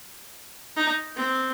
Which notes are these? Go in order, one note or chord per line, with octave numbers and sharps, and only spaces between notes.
D#4
C4